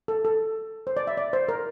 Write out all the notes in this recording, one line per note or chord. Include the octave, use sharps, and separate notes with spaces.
A4
A4
C5
D5
E5
D5
C5
A#4